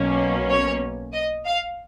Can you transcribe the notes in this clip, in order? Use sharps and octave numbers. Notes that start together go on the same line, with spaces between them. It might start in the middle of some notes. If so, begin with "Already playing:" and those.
Already playing: B1 B2 A#3 C#4
C#5
D#5
F5